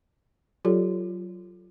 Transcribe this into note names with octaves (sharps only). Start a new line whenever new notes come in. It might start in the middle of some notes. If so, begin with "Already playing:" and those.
F#3 F4 G4 A4 C#5 D5